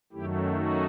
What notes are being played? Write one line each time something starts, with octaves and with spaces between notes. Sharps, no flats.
F#2 D#3 F#3 A3 E4 G4
D#4 F#4